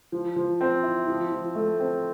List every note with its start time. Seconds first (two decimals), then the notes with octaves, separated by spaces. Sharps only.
0.12 F3
0.36 F3
0.61 C4
0.83 E4
1.08 F3
1.32 F3
1.55 A3
1.80 C4